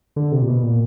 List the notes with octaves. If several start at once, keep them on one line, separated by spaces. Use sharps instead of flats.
D3
C3
A#2
B2
A#2